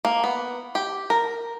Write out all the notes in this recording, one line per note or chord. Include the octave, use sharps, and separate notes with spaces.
A#3
B3
G4
A#4